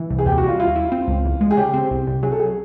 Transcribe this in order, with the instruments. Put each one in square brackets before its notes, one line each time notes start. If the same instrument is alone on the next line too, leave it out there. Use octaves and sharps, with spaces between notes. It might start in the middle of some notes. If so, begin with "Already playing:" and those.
Already playing: [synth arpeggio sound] E3
C2
[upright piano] G#4
[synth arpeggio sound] D#2 [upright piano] G4
[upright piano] F#4
[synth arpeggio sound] G3 [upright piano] F4
[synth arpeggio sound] E4 [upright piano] F4
[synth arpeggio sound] E4
C4
C#2
E2
G#3
[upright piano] G#4
[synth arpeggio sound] C#3 [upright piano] G4
[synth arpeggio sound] C4
C2
C2
[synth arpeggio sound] F#3 [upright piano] G#4
[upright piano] A4
G#4